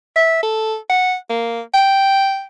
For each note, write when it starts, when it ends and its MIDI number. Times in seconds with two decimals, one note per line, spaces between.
0.16 0.40 76
0.43 0.75 69
0.89 1.15 78
1.30 1.61 58
1.74 2.45 79